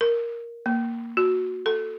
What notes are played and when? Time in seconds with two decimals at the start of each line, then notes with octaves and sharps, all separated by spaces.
0.01 A#4
0.66 A#3
1.17 F#4
1.66 A4